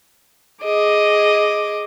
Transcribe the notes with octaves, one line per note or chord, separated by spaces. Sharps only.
G#4 D#5 D6